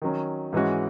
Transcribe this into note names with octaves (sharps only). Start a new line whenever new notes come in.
D#3 F#3 C#4
G#2 E3 G#3 C#4 F#4